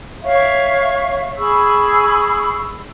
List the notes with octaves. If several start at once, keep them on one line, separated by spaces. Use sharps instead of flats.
C#5 E5 F5 C#6
G#4 B5 C#6 E6